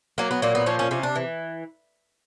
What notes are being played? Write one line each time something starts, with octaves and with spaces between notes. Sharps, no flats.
F#3 A#3
B3
A#2 A#3
B3
F3 C#4
C#4
C3 C#4
D4
E3